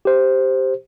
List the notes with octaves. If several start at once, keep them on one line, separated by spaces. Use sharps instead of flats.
G4 C5